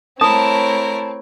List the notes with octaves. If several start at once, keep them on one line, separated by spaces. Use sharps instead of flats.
A3 C4 E4 A#4 C#5 A5 D#6